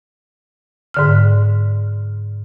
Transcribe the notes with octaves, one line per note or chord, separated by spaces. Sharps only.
G#2 D3 F6